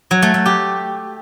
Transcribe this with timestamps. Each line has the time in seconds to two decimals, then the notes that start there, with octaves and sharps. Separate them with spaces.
0.11 F#3
0.22 A3
0.34 A3
0.46 G4